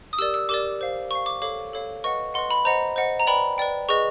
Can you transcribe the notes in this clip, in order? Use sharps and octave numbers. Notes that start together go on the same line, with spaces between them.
D#6
G4 A#4 D5 E6
E6
G4 A#4 D5 D6
C5 F5
C5 F5 C#6
D6
A4 C#5 F5 D6
A4 C#5 F5
B4 D#5 F#5 C#6
B4 D#5 F#5 C6
B5
C5 D#5 F#5 A#5
C5 D#5 F#5
A#5
B4 D5 G5 B5
B4 D5 G5
G#4 B4 D#5 C#6